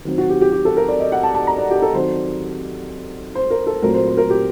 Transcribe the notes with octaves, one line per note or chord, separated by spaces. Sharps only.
D#3 F#3 C4
F#4
G4
G4
G4
A4
A#4
D5
D#5
F#5
A5
A5
A#5
D5
G4
A4
D#3 F#3 C4 C5
C5
A#4
A4
A#2 F#3 A3 C4 A#4
C5
C5
A#4
G4